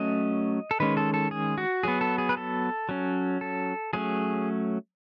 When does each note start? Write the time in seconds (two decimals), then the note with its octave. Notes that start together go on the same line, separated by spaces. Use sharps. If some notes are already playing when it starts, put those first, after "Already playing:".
Already playing: F#3 A3 C#4 D#5
0.71 A4
0.80 D#3 G#3 C#4 B4
0.97 A4
1.14 A4
1.31 G#4
1.58 F#4
1.83 F#3 B3 G#4
2.01 A4
2.18 G#4
2.29 B4
2.37 A4
2.89 F#3 C#4
3.41 A4
3.93 F#3 A3 C#4 G#4